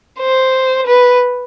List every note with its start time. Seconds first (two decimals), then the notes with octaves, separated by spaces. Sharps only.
0.20 C5
0.86 B4